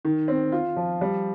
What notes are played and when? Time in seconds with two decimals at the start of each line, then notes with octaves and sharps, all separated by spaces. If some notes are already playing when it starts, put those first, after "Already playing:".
0.05 D#3
0.28 C4
0.52 F4
0.76 F3
1.01 G3